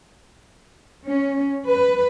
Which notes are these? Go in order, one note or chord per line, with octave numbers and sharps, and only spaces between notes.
C#4
B4